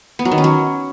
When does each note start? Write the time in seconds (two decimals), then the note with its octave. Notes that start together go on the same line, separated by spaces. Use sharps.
0.19 B3
0.25 F#3
0.32 D#3
0.38 C#4
0.44 F#3